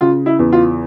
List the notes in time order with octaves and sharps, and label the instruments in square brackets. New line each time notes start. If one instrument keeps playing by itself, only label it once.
[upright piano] C#3 F4
E4
E2
F4